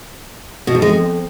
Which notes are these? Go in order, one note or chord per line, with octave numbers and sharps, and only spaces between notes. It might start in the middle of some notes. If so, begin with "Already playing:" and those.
B2
G#2
G#3
F2